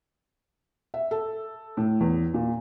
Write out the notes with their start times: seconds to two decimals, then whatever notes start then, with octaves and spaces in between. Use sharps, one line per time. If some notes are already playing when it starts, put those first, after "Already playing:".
0.94 E5
1.11 A4
1.77 A2
2.00 E2
2.34 A#2